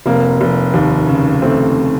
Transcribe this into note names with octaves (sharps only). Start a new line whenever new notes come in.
F1 A#3
F1
D#2
C#3
A3 C4